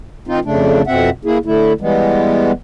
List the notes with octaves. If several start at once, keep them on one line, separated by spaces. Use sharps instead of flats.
D#3 C4 D#4 F4
F2 C#3 A3 D4
F2 B2 C4 E5 F#5
A#3 E4 G#4
D3 A3 E4
E3 G3 G#3 B3